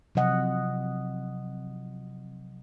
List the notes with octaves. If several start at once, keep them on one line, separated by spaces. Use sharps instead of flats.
C3 F3 F#3 D#5 F#5